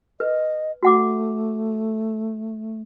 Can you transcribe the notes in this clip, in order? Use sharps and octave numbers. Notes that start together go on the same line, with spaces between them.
B4 D#5
A3 F#4 F#5 D6